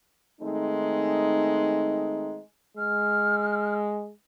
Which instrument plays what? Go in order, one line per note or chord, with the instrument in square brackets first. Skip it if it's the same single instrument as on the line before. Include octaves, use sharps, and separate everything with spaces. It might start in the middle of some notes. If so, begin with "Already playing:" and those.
[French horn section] D#3 G#3 A3 C4 D#4
[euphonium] G#3 [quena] F6